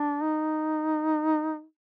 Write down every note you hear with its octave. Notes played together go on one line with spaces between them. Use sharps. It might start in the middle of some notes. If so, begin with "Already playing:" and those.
Already playing: D4
D#4